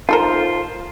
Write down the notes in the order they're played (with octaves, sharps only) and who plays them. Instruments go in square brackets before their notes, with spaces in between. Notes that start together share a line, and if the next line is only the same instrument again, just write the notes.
[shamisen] D#4 A4 A#4 [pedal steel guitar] F4 C5